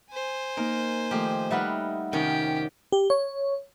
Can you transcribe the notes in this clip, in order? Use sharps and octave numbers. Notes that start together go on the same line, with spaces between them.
C5 G#5
A#3 D#4 A#4
D#3 F3 A3 G4
G3 D#4 B4 E5 F#5 F6
F2 C3 D#3 C#4 G4
G4
C#5